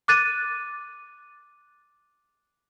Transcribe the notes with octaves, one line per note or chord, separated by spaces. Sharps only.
D6 F#6 A6 D#7